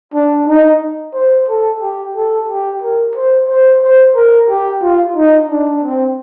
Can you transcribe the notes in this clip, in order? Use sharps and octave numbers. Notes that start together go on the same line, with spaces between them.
D4
D#4
C5
A4
G4
A4
G4
A#4
C5
C5
C5
A#4
G4
F4
D#4
D4
C4